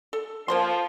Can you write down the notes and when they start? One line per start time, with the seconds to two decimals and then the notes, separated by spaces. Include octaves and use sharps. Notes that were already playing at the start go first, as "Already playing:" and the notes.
0.13 A4
0.48 F3 A#3 C5 C6